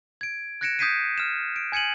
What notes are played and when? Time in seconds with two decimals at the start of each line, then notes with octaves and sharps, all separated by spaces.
0.21 G#6 D7
0.61 F#6 G#6 A#6 C#7 D7 E7
0.79 D#6 G6 G#6 B6 C7 D#7
1.18 F6 E7
1.56 D7
1.72 G#5 G#6 C#7 D#7 F#7